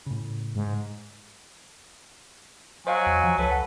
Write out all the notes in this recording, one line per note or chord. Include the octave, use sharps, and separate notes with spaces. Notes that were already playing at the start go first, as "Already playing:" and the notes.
A2 C#3
G#2
F#3 C5 D#5 F5 G#5
E2
F3
C#2 A4 B4 C#5
F#5